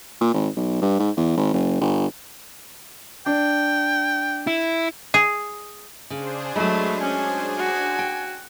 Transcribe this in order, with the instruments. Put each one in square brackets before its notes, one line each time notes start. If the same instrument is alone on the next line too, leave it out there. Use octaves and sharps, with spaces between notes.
[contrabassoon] A#2
G#1
B1
G2
G#2
E2
G#1
F#1
G1
[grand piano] D4 [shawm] G5
[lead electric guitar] E4
[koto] G#4
[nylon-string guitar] C#3 [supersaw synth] D4 G#4 C5
[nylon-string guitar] F#3 G#3 [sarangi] A3 [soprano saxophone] B5
[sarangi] C#4 [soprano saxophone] G#5
[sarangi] F#4
[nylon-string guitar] G5